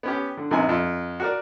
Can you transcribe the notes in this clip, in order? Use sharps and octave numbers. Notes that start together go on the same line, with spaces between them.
B3 C#4 G4
D3
A#1 C3 B3 D#4 G#5
F2
F#4 A#4 D5